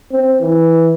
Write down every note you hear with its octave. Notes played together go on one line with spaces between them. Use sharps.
C4
E3